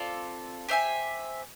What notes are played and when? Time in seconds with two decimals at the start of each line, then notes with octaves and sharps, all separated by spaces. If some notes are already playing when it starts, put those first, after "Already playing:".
Already playing: C4 F4 A4 D5
0.68 G4 C5 E5 G#5